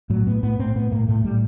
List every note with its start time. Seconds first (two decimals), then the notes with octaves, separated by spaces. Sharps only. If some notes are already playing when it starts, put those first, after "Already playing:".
0.10 A2 F#3
0.27 A2 B3
0.43 A2 B3
0.59 A2 C4
0.75 A2 B3
0.91 A2 A#3
1.08 A2 A3
1.24 A2 G3